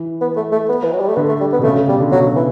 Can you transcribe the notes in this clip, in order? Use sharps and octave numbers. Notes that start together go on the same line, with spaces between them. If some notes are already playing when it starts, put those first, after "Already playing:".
Already playing: E3
B3
A3
A3
B3
E3
F#3
G3
A3
D3 B3
A3
G3
B3
B2
C#3 A3
C#3
B2 G3
D3
B2 F#3
E3